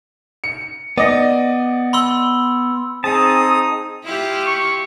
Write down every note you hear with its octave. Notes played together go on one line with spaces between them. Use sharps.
C#7
B3 D5 D#5 A#6
B5 C6 E6
C4 D#4 G#4 A5 D#6
E4 F4 G4
C#6